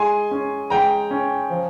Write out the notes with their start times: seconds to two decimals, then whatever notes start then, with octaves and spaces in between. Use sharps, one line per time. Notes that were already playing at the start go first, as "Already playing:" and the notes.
Already playing: G#3 G#5 C6
0.31 C#4
0.70 G#3 G5 A#5
1.11 C#4
1.50 F3